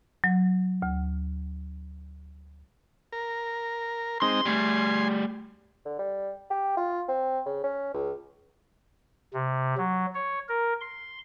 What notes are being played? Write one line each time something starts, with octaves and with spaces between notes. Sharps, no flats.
F#3
D2
A#4
G#3 C4 D#4 C6
G3 A3 G#5 C6
D3
G3
G4
F4
C4
C#3
C#4
C#2
C3
F#3
C#5
A#4
C6